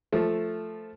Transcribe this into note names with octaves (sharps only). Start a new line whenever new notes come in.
F3 A3